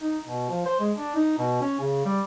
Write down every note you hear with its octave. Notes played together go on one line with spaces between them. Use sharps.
D#4
B2
F3
C5
G#3
D4
D#4
B2
C#4
C#3
G3